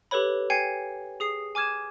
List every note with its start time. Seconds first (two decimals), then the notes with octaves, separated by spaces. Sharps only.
0.11 G4 A4 B4 C#5 B5
0.50 G5 G#5 G#6 C7 C#7
1.20 G#4 D#6 C7
1.55 G#5 D6 F6 G#6 E7